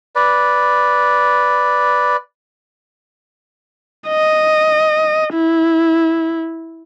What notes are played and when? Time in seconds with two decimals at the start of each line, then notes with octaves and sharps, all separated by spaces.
0.15 B4 D5
4.08 D#5
5.33 E4